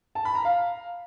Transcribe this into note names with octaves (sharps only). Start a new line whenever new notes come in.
A5
B5
A#5
F5